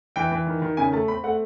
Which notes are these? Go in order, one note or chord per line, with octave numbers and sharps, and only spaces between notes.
E3 G5
E3
D#3
D#3
C#3 G#5
A3 A5
C4 B5
A3 F#5